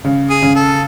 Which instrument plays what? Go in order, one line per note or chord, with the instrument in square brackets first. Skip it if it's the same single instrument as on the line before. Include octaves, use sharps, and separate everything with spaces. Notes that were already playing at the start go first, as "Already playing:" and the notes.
[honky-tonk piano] C#3
[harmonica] G#4
[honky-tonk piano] C#3
[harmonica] A4